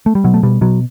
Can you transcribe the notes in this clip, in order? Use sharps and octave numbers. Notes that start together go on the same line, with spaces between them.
A3
G3
B2 F#3
A3
B2 G3
B2 F#3